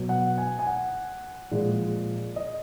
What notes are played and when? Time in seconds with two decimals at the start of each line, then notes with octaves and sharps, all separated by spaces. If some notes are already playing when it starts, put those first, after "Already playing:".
Already playing: B2 F#3
0.09 F#5
0.38 G#5
0.59 G#5
0.67 F#5
1.51 A#2 F3 G#3
2.36 D#5